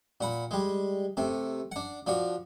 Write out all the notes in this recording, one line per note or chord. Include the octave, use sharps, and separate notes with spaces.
A#2 F#5 B5
G3 G#3
C3 A3
D4 F#5
F3 D4 F#4